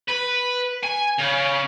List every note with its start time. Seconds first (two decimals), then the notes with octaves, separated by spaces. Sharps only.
0.08 B4
0.83 G#5
1.18 C#3